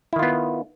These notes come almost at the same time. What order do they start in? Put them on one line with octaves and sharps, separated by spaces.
E4 D#3 F4 B3